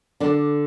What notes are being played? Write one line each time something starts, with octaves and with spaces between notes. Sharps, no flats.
D3 D4